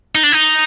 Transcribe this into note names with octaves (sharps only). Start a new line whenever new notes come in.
D#4
D4
D#4